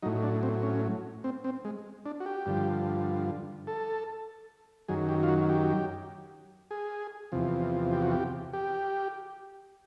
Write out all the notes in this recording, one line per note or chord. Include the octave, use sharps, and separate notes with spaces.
A2 F#3 D#4
D4
C4
C#4
C4
C4
G#3
D4
F#4
G4
G2 D3 F3
A4
F#2 D#3 F#3 G#4
G4
F4
F#4
G4
G#4
E2 C3 F3
G4
F#4
G4
G4